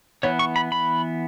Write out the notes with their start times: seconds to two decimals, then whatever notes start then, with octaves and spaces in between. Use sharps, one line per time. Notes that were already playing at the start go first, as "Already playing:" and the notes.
0.23 E3 B3 C#5
0.39 C#6
0.56 B5
0.72 B5